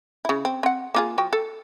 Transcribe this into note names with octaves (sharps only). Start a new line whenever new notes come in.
C#3 E4
C4
C4 F#5
A#3 F4 G#4
F3 F#4 G5
A4